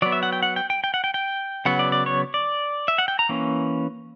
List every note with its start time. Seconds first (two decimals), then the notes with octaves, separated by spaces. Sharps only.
0.02 F#3 B3 D5
0.12 E5
0.23 F#5
0.33 G5
0.43 F#5
0.56 G5
0.70 G5
0.84 G5
0.94 F#5
1.04 G5
1.14 G5
1.65 C#3 F#3 B3 F#5
1.79 D5
1.92 D5
2.06 C#5
2.34 D5
2.88 E5
2.98 F#5
3.08 G5
3.19 A#5
3.29 E3 A#3 C#4